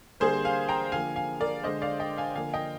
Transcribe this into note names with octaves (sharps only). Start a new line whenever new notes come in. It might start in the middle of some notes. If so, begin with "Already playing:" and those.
D3 G3 A#3 G#4 C5
F5 G#5
G5 A#5
D3 F3 A#3 F5 G#5
F5 G#5
A#4 D5
D3 G#3 C5 D#5
D5 F5
D#5 G5
F5 G#5
D3 F3 A#3 F5 G#5
D#5 G5